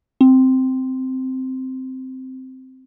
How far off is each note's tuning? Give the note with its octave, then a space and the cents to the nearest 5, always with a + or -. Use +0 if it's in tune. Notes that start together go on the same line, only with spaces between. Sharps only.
C4 -5